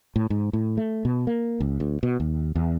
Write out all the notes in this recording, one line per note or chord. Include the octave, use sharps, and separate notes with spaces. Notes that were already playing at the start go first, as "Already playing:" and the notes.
A2
G#2
A2
A3
B2
A#3
C#2
D2
B2
D#2
E2